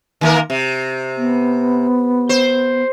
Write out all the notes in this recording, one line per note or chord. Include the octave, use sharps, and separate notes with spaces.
D#3 A#3 A#4
C3
B3
C5